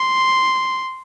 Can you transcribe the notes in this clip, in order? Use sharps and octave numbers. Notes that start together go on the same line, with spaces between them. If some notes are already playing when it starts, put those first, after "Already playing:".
Already playing: C6